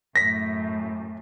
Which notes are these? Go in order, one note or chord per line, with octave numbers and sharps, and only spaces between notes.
F#2 A2 A#6 B6